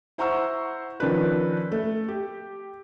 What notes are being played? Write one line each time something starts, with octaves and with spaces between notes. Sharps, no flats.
E4 C5 F#5 A#5 C#6 E6
D#3 F3 C#4 D4 F4 B4
A3
G4